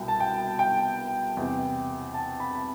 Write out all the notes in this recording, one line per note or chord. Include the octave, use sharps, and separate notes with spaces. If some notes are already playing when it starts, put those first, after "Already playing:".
Already playing: C2 B2 B3 G5
A5
G5
G5
E2 C3 G3
A5
B5
B5